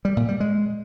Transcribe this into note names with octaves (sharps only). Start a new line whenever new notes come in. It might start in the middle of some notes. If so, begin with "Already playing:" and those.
G3
A#2
G3
G#3